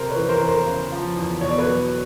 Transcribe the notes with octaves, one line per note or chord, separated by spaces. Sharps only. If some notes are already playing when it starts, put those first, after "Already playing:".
Already playing: C3 A#4 C5
B4 C#5
E3
A#4 C5
E2
A#4 C5
C#3
F3
E2
B2 C#5
D5
B4 C#5
F#3